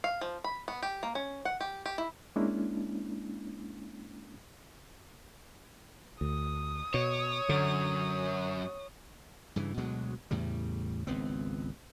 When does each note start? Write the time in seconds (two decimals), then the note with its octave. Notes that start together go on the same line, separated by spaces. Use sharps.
0.04 F5
0.21 F3
0.44 B5
0.68 B3
0.83 G4
1.03 A#3
1.15 C#4
1.45 F#5
1.61 G4
1.86 G4
1.98 E4
2.36 G#3 A#3 C#4 D4 E4
6.21 D2 D#6
6.94 B2 C#5
7.49 F#2 D3
9.56 G2 C#3 E3
9.77 D2 B2 F#3 G#3
10.31 E2 A2 C#3 G3
11.07 G#1 C#2 B3 C4